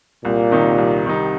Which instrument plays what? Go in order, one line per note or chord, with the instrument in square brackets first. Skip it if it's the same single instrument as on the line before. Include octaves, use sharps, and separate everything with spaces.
[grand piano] C2 [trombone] A#2
[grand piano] C3 D#3 G3 D#4
C2
C3 D#3 G3 D#4